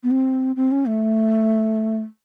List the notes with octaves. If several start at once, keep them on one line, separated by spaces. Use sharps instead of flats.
B3
C4
C4
C#4
A3